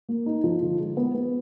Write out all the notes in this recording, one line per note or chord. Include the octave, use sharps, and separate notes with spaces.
A#3
D#4
F3
D3
G#3
B3
B3